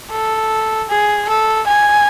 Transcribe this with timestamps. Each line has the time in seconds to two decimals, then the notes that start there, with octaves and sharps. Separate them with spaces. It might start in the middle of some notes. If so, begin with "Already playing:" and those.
0.12 A4
0.90 G#4
1.29 A4
1.68 G#5